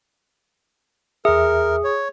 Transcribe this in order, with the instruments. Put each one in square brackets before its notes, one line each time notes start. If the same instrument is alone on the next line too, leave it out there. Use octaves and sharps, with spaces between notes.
[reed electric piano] E2 E5 [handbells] G#4 [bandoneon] A#4
[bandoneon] C#5